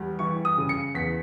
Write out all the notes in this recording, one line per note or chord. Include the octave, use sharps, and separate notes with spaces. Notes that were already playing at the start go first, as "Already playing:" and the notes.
Already playing: E2 G3
E3 C#6
D#6
C#3
C#7
E2 B6